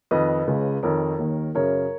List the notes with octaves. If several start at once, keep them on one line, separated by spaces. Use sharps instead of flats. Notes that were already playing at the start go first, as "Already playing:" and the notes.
F2 D#3 B4 D#5
C#2 C#3
F2 D#3 A#4 C#5
D#2 D#3
F#2 C#3 A#4 C#5